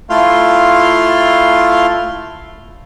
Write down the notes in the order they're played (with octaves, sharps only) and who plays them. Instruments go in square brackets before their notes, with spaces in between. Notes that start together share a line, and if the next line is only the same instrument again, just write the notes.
[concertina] A3 E4 F4 F5 C6